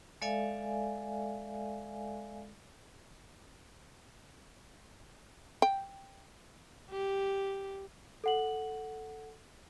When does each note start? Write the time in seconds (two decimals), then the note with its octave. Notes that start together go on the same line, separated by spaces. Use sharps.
0.22 G#3 A4 D5 E5 F5 G#5
5.62 G5
6.91 G4
8.24 A4 F#5 F#7